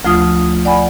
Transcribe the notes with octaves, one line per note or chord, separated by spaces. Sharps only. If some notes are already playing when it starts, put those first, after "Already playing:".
D2 F3 A3 F4 D#6
D5 F#5 G#5 B5